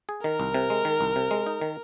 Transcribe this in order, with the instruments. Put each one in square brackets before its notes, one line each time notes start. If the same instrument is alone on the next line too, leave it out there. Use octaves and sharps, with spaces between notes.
[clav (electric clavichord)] G#4
[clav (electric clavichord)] D#3 [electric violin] A#4
[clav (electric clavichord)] C2
C3
G#3
D#3
C2
C3
G#3
D#4
D#3